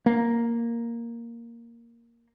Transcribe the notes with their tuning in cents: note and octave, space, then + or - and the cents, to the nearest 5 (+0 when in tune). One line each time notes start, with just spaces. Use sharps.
A#3 +0